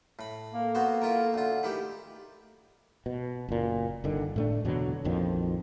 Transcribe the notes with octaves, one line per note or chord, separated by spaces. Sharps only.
A2 B5
A#3 A4
B3 F#4 C5
E4 F4 A#4
D2 F4
D#3 A3 E4 G4
B2
F#1 A#2
G1 D3 D#3
A2 A3 D4
E2 B2 D3 F#3
A#1 F2 D#3 F3